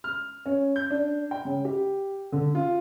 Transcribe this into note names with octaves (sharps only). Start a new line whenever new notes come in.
F6
C#4
G6
D4
G5
C#3
G4
D3
F4